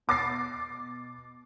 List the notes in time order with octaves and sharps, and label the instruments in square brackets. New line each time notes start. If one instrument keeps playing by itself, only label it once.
[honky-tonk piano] B2 D6 A6 C7